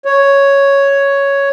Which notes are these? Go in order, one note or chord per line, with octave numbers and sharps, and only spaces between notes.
C#5